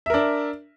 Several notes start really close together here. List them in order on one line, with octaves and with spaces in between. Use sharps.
E5 A#4 D4